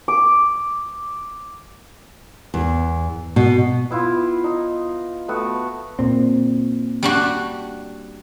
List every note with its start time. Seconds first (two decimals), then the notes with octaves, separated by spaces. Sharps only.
0.08 D6
2.54 E2
3.36 B2
3.91 B3 E4 F4
4.44 D#4
5.28 A3 B3 F#4
5.99 A#2 C4
7.03 G3 D4 F#4